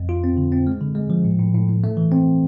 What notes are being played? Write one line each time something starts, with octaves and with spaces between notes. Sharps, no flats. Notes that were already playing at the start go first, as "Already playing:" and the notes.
Already playing: F2
F4
C4
D3
C4
G#3
D3
G#3
F3
A2
A2
A2
A2
A3
E3
C4